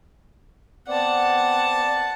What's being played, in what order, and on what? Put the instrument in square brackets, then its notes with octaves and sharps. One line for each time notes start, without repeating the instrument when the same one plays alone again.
[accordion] B3 C4 D5 [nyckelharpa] F#5 A5